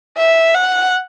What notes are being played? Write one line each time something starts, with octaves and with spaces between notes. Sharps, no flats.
E5
F#5